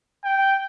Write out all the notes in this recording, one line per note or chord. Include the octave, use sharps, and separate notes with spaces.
G5